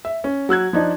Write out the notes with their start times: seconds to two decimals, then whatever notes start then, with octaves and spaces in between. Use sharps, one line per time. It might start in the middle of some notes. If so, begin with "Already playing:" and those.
0.05 E5
0.24 C#4
0.49 F#3 E6 F#6 G#6
0.73 F3 D4 D#4